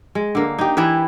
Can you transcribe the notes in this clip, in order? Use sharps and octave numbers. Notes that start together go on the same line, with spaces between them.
G#3
D3 A#3
D#4 G4
E3 E4 G4 B4